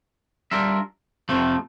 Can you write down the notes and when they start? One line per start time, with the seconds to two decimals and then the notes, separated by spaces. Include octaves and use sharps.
0.51 G3 D4 F4 A#4 E5
1.29 F2 C3 F3 A3